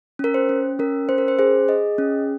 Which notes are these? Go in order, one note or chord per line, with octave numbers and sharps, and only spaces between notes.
C#4 A#4
C5
C#4
C#4 A#4
C#4 C5
A#4
C5
G#4 C5
G#4 D#5
C#4